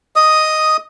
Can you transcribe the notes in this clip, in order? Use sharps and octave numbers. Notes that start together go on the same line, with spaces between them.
D#5 D#6